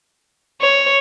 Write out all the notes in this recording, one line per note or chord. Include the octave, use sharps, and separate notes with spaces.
C#5